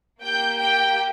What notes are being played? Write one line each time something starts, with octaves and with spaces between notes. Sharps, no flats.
A#3 G4 G5 G6
G5 G6